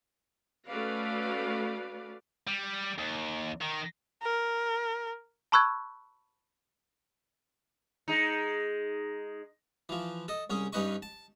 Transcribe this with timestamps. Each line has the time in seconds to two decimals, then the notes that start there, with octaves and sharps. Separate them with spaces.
0.67 A3 C#4 F#4 B4 D5 F5
2.47 G3
2.98 D#2
3.62 D#3
4.23 A#4
5.52 A5 B5 C#6 E6 F#6 G#6
8.08 G#3 D#4
9.89 E3 F3
10.28 A4 D#5
10.50 C2 C#4 G#4
10.73 G2 C#4 D#4 B4 D#5 C#6
11.02 A5